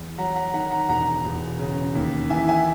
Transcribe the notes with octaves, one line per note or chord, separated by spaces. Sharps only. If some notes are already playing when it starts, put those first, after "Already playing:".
Already playing: E2
F#3 F#5 A#5
F#5 A#5
D#3 F#5 A#5
F#5 A#5
E1 F#5 A#5
E1
C#3
D#2
E3 E5 G#5
E5 G#5